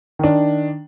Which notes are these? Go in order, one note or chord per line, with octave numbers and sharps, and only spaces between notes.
D#3 D4